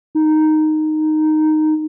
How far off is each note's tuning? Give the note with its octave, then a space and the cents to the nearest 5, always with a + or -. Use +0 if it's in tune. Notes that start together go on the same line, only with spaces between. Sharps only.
D#4 -5